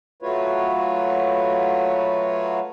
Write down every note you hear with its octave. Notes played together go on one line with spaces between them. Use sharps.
F#3 A3 F4 F#4 B4 C#5